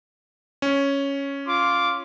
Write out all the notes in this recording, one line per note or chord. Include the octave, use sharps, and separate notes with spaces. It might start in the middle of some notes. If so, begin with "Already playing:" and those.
C#4
F4 C6 D6